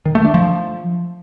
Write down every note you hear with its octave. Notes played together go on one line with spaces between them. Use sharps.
D#3
A3
D4
F3